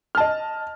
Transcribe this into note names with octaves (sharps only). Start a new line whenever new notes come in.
D#5 A5 F6